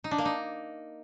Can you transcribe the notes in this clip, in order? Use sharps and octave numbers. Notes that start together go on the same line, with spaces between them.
D#4
D4
A#3
D#4